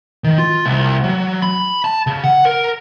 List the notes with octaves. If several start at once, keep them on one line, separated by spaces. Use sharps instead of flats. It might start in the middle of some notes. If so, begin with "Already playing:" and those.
D#3
F4
C2
F#3
B5
A5
C#3
F#5
A#4